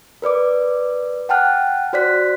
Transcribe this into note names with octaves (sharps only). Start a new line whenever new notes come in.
A#4 B4 D5 D6
F#5 G5 A5 F6 F#6
F#4 C5 D5 F#6 B6